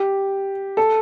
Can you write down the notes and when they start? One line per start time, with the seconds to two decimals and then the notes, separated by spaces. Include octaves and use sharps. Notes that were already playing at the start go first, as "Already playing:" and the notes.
Already playing: G4
0.77 A4